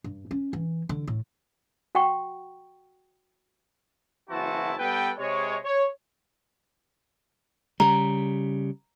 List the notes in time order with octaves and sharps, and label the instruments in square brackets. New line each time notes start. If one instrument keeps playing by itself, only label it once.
[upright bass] G2
C#4
E3
D3
A2
[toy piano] F#4 F#5 G5 C#6
[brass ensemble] F#1 E3 C4 E4 F#4 A5
G3 B3 A4 B4 G5
C3 G#3 C#5
C#5
[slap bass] C#3 G3 [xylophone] A#5